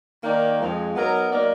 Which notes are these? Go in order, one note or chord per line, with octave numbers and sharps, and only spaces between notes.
D#3 A#3 D#4 A#4 D5
F2 F3 G#3
F#3 B3 D#4 A#4
F#3 A#3 D#4 A#4 D5